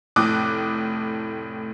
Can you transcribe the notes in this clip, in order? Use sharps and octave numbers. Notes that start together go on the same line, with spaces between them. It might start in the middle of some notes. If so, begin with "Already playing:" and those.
F1 A2 D6 D#6 F#6